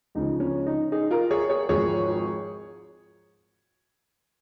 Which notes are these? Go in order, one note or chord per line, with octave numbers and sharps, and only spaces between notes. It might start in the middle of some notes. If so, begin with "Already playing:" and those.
C#2 C#3 F3 D#4
C#4
D#4
D#4 G#4
F4 A#4
G#4 C#5
G#4 C#5
G#1 G#2 F3 G#4 C#5